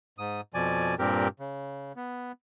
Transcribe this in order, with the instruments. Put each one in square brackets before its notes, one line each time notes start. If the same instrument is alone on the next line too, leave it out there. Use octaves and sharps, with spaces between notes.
[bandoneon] G#2 D#6
F2 B2 F3 D5 G#5
G2 A#2 C4 G4 A#4
C#3
B3